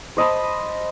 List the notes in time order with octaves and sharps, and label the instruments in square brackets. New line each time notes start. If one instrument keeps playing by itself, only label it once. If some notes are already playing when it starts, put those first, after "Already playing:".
[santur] C5 D#5 A5 B5